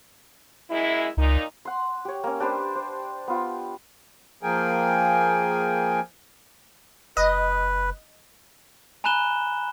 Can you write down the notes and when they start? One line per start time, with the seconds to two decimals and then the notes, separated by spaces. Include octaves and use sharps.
0.70 F#2 G#3 E4
1.17 C#2 A#2 D#4
1.65 F#5 C6
2.05 G4 C#5
2.24 A#3 C#4
2.40 D4 G4 B4 C5
2.76 C5
3.28 B3 F4 G5
4.43 F3 A#3 G#4 A#4 G5 G#5
7.17 F#1 B4 D#5
9.04 G#5 A#5 B5 F#6 E7 G7